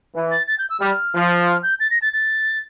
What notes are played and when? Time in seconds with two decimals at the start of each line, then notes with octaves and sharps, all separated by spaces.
0.14 E3
0.31 A6
0.48 A6
0.59 G6
0.70 E6
0.80 G3 F6
1.14 F3
1.46 F6
1.63 G6
1.80 A6
1.91 A#6
2.02 A6
2.13 A6